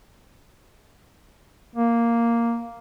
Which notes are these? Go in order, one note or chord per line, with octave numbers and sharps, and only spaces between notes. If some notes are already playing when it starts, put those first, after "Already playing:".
A#3